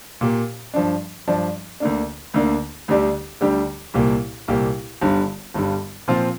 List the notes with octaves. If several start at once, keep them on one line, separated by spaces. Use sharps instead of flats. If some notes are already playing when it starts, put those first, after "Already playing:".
A#2 A#3 G4
G2 F3 D4
G2 F3 D4
D2 D3 A#3 D4
D2 D3 A#3 D4
D2 D3 G3 D4 G4
D2 D3 G3 D4 G4
C2 A#2 A#3 G4
C2 A#2 A#3 G4
G1 G2 D3 G3
G1 G2 D3 G3
A#2 F3 C4 F4